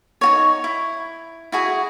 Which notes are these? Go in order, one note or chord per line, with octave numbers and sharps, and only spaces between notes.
D#4 F#4 C#5
E4
E4 F#4 G#4